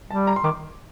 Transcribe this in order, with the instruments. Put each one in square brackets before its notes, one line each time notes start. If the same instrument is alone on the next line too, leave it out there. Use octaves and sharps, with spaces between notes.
[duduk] G3 [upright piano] A5
[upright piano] A#5
C6
[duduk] D#3 [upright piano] D6